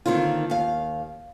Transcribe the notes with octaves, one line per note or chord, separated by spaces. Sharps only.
D3 D#3 A#3 C4 F4
D#2 F5